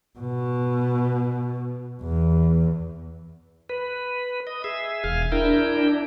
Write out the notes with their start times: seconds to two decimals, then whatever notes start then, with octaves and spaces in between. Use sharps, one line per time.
0.19 B2
2.02 E2
3.69 B4
4.47 D#5
4.64 G#4 E5
5.04 E1 F5 G#5
5.32 D4 E4 A#4 G5